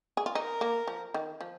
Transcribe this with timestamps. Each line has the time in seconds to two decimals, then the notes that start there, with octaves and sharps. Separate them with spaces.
0.17 G#4
0.26 F4
0.35 D#4 A#4
0.61 A#3
0.87 F3
1.14 D#3
1.41 F3